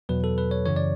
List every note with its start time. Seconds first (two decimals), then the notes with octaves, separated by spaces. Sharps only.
0.09 E2 B2 F#3 B4
0.24 A4
0.38 B4
0.51 C#5
0.66 F#2 C#3 E3 C#5
0.76 D5